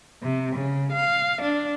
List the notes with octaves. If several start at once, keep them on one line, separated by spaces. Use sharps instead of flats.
C3
C#3
F5
D4